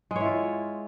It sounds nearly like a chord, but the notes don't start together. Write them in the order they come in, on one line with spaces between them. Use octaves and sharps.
G#3 C#5 E4 F4